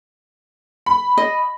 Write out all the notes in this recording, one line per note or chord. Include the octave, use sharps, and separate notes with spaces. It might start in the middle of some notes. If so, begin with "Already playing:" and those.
B5
D#5